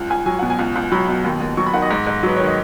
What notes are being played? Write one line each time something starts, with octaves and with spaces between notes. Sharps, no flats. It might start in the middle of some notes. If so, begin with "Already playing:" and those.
Already playing: C#2
C#2 G#5
F#3 G#5
B2 F#5
G#5
C#2
C#2
F#3 B5
B2
D#2
D#2
F#3 C#6
B5
D#3 F#5
D#5
G#2
G#2
F#3 B4
D#3 C#5
D#5